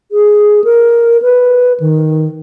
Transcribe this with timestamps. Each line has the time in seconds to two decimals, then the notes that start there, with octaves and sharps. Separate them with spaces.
0.12 G#4
0.64 A#4
1.22 B4
1.80 D#3